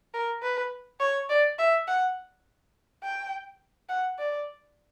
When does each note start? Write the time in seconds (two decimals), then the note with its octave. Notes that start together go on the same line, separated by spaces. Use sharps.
0.14 A#4
0.42 B4
1.00 C#5
1.30 D5
1.59 E5
1.88 F#5
3.03 G5
3.89 F#5
4.19 D5